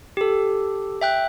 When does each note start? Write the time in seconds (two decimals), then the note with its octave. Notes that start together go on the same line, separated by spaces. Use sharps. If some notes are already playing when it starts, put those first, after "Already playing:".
0.17 G4 A4
1.01 E5 G5 F#6